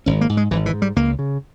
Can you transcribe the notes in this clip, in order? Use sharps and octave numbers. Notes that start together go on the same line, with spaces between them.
G#1 C#4
A#3
G#2
G#3
G#1 E3
E3
G#2
G3
C#2 A#3
C#3